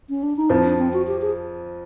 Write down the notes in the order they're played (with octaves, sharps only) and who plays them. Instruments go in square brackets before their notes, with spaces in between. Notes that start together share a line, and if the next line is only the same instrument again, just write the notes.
[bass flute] C#4
D4
D#4
[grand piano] F2 F3 [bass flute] E4
[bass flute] D4
C4
F#4
G4
G#4